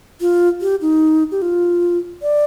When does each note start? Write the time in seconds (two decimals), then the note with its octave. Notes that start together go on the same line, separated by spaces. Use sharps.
0.21 F4
0.61 G4
0.81 D#4
1.31 G4
1.42 F4
2.22 D5